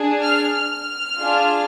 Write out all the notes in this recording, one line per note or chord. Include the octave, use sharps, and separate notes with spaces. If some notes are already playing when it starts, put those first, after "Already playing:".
Already playing: D4 G#4
F6
F6
D4 F4 G#4